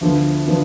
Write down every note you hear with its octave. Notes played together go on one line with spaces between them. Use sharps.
D2 D3 F3 B3
D3 F3 B3